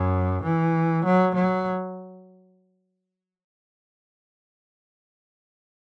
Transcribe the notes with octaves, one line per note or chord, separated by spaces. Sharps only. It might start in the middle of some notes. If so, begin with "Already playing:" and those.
Already playing: F#2
E3
F#3
F#3